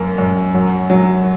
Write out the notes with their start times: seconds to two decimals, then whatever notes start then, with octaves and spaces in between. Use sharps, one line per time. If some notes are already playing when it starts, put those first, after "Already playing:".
Already playing: F#2 A#3
0.18 F#2
0.54 F#3
0.90 F#3